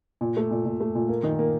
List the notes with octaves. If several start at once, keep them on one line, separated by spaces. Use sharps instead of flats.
A#2
A3
A#2
A#2
A3
A#2
A#3
D#3
A#3